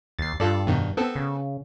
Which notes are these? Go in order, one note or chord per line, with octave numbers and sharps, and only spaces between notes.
D#2 A6 C7
G2 F4 A4 D5
F2 B2 D#3
B3 C4 A4
C#3